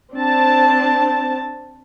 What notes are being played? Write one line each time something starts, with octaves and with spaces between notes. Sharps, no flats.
C4 D4 A5